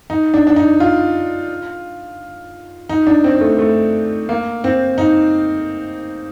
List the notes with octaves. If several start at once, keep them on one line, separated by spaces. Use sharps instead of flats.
D#4
D4
D4
D#4
F4
D#4
D4
C4
A3
A3
A#3
C4
D#4